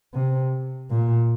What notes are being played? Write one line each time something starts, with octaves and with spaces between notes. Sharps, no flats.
C3
A#2